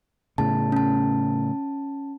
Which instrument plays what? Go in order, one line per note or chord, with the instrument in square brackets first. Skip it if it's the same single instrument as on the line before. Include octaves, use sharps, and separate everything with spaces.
[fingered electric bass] A2 C#3 [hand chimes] A5
[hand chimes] C#4 A5